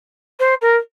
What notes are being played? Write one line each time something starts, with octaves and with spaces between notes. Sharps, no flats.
C5
A#4